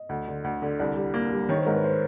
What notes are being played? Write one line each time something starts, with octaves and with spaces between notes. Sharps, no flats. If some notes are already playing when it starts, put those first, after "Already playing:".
Already playing: D#5
D2
D3
D2
D3
C2 D5
G3
A#3
G3
D#3 C#5
C5
G#2 A#4
B4
C5